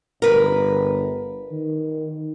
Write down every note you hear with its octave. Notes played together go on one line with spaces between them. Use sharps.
G1 A#4 B4
D#3